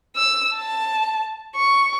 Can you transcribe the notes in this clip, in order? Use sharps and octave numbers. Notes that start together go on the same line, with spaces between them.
E6
A5
C#6